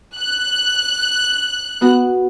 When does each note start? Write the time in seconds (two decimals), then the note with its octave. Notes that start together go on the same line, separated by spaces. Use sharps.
0.16 F#6
1.81 B3 F#4